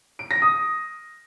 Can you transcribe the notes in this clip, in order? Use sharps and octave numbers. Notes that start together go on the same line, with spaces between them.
D7
A#6
D#6